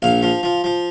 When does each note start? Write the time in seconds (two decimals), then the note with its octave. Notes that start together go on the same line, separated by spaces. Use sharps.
0.02 A#1 F5
0.23 F3
0.43 F3
0.64 F3